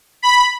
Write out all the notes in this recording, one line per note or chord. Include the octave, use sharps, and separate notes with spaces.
B5